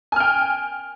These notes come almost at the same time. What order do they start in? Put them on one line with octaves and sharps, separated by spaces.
G#5 F6 G5